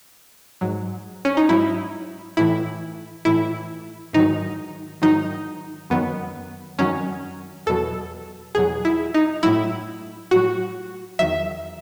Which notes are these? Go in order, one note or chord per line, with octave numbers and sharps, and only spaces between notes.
G#2 F#3
C#4
D#4
G#2 F#3 E4
A2 E3 E4
A2 E3 E4
G#2 D#3 F#3 D#4
G#2 D#3 F#3 D#4
F#2 D#3 F#3 B3
F#2 D#3 F#3 C#4
E2 B2 F#3 A4
E2 B2 F#3 G#4
E4
D#4
A2 F#3 E4
A2 F#3 F#4
E2 D#3 F#3 E5